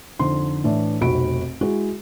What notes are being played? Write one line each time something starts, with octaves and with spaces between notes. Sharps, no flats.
F2 D3 D#4 C6
A2 E3 D4
F1 B1 C4 F#4 B5 D7
G#3 E4 F#4 G#4